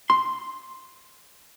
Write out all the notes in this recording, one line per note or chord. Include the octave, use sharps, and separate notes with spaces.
C6